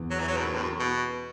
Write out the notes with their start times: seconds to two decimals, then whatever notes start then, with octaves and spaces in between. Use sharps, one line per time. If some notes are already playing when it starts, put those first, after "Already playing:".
Already playing: E2
0.10 F#3
0.19 E3
0.28 F#3
0.36 B2
0.45 F#2
0.54 A2
0.62 F#2
0.80 B2